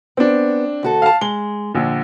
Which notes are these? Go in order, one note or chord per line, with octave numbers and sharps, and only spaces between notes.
B3 C4 D4
D2 F#4 A4
F5 A5
G#3 G7
A#1 D3